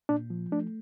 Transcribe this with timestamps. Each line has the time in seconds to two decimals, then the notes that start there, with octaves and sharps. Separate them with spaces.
0.09 A#2 D4
0.30 F3
0.52 A3 D4